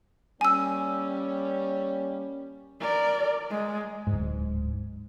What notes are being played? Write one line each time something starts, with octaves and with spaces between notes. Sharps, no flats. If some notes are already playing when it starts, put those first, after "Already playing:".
G3 A#3 C#4 G#5 E6
A#4 D5
G#3
D1 G#2